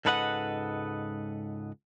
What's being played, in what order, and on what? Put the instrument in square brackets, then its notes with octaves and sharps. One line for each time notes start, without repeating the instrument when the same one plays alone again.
[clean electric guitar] C#2 G#2 A4 B4 D#5 F#5